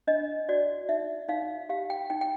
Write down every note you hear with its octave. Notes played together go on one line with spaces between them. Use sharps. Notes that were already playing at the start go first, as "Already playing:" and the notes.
D4 D#5
F#4 D5
D#4 E5
D#4 F5
G4 F5
G5
D#4 G5
G5